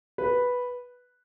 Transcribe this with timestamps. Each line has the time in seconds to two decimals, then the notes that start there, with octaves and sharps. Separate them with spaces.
0.18 B4